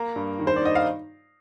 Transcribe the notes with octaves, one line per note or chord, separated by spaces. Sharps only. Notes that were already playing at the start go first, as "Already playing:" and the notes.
Already playing: A#3 A#5
G2
D#3
C5
D5
D#4 D#5
F5